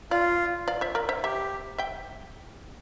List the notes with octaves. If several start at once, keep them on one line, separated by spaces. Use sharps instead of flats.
F4 D5 F5
D5 F5
C5 E5
A#4 D5
C5 E5
G4 C5 E5
E5 G5